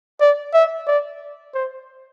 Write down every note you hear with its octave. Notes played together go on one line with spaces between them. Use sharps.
D5
E5
D5
C5